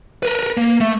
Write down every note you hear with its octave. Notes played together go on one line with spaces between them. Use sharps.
A#4 B4
A#3
A3